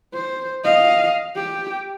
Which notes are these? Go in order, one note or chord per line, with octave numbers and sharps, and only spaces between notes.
C5
D#5 F5
G4